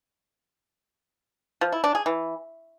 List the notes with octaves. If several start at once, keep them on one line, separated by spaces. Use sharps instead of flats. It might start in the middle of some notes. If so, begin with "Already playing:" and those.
F3
E4
D4
G#4
E3